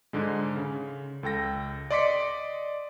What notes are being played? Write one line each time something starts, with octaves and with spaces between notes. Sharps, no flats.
G#2 D3 G#3
C#3
C#2 A4 G5 A#6
D5 D#5 C6 D6 B6 C#7